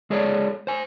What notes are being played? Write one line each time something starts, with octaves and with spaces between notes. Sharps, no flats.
G#3 G#4 A4 C#5 D5
C5 G#5